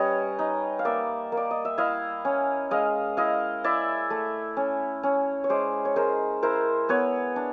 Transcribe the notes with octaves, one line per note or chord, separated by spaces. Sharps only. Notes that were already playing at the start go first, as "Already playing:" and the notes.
Already playing: G3 C#4 B4 C#5 D#5
D#4
F5
A#3 D5 E5
A#3
D5
D#5
E5
E4 D#5 F5
C#4
G#3 D#5 F5
E4 D#5 F5
E4 D5 E5
A3
C#4
C#4
C#5
G#3 C5 D5
C#5
G#3 A#4 C5
E4 A#4 C5
B3 B4 C#5
D4